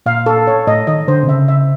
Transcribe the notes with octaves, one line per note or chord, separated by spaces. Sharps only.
A#2 F5
A4
C#5
A2 D#5
D#3 D#5
D3 C5
C3
C#3 E5
E5